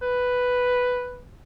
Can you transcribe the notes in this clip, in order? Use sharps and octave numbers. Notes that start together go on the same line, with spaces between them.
B4